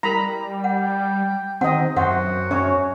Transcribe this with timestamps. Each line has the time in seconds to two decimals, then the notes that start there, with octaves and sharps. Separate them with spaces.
0.03 G3 E4 A#4 A#5 B5
0.64 F#5 G5
1.61 D#3 C4 D#5 F#5
1.97 F#2 D#4 F#4 C5 E5 F#5
2.51 C#4 C#5 E5 C#6